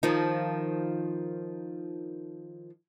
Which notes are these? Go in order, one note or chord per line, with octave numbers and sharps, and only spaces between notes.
D#3 F3 D#4